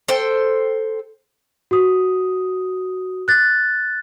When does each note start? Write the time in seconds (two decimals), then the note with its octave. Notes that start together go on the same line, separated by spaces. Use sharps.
0.08 A4 C5 G5
1.71 F#4 D#6
3.28 F#6 A6